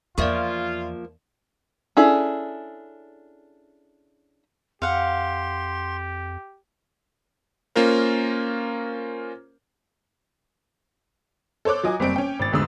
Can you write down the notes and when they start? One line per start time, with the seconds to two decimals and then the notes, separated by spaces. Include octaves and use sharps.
0.18 E2 F3 A#3 F4 D5 E5 C#6
1.97 C#4 D4 E4 G#4 A4
4.82 F2 G4 F5 F#5 C6
7.76 A#3 C#4 F4 A#4 C5
11.65 A4 C5 C#5 D6 F#6
11.83 F#3 F4 D#5 G#5
12.00 F#1 G3 C4 D7
12.16 C#4 G5
12.39 G#1 A6
12.52 F1 D2 G#2 D3 D#6 E6